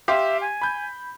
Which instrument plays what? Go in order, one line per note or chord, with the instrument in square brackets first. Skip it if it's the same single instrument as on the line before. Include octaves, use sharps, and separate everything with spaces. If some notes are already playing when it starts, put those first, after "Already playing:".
[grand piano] G4 F5 C6 [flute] E5
[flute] G#5
[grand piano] B5 G6